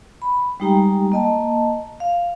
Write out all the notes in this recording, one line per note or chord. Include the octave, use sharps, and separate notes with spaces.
B5
G3 G#3 D#4 G4 G5 A#5
A#3 D#5 A5
F5